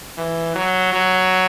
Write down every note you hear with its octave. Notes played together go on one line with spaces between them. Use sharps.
E3
F#3
F#3